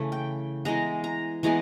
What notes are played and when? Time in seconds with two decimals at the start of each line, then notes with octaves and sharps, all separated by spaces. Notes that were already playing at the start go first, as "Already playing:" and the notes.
Already playing: C#3 E3 A3
0.12 G5
0.65 E3 G#3 B3 A#5
1.04 A#5
1.43 E3 G#3 B3 A#5